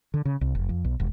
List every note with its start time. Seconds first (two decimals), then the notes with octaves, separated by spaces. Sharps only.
0.14 D3
0.25 C#3
0.41 C2
0.55 F1
0.69 F2
0.85 B1
1.00 E1